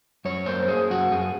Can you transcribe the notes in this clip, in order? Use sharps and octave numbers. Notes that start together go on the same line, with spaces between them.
F#2 C#5
A#3 C5
A#3 G#4
F#2 F#4
F#2 G#4